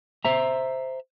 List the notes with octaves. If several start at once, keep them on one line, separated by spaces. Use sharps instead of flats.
C5 E5 A#5